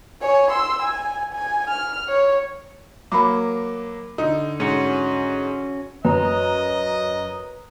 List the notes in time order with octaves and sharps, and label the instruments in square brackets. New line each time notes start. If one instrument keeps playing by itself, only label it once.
[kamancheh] C#5 G#5
C6 E6
G#5
G#5
F6
C#5
[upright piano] F#3 A#3 [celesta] B5 D6
[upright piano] D3 [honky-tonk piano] D#4
[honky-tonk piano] G#2 [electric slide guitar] C#4 F#4
[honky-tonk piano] F#2 [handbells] B4 A#5 [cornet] D#5